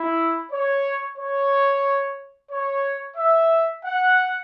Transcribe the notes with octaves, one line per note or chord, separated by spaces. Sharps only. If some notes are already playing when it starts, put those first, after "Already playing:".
Already playing: E4
C#5
C#5
C#5
E5
F#5